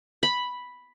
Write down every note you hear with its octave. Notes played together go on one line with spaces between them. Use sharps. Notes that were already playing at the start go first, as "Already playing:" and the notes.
B5